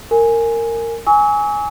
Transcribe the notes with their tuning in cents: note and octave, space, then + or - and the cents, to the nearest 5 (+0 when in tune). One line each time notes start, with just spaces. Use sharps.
A#4 -20 G#5 +0
G#5 +0 C#6 +40 E6 -40